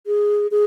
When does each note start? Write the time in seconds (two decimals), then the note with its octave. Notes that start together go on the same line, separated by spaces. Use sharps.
0.07 G#4
0.51 G#4